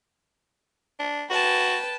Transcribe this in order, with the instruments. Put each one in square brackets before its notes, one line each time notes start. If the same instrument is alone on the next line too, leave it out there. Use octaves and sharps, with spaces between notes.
[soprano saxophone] D4
[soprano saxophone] F#4 [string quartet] B4 G5 A5